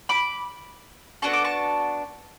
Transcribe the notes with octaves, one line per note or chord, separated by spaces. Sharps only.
B5 D6
B3 D4 F#4 A4 C#6
D6
A5 C#6